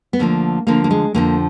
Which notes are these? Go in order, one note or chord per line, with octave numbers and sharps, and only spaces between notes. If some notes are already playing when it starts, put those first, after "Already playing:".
B3
D2 D3 F3 A#3
D2 D3 F3 A#3
A#3
G#3
F2 D3 F3 A#3